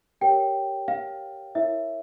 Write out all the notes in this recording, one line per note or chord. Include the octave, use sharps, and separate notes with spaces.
G4 A#4 C#5 G5
F5
E4 A#4 C#5 E5